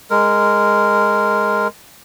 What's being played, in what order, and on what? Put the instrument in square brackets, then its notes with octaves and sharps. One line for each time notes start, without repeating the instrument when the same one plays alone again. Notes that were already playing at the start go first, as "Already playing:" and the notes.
[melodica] G#3 A#4